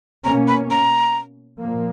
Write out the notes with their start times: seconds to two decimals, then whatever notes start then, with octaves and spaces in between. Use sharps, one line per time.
0.24 B2 A#3 C#4 A#5
0.48 B5
0.71 A#5
1.60 A#2 F3 A#3